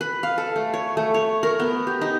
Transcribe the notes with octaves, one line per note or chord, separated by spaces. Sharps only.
B4
F5
A4
A3
C#5
A3
C#5
A#4
B3
G4
D#4